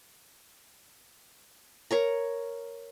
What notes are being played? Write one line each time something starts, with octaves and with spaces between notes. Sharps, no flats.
A#4 C#5 A#5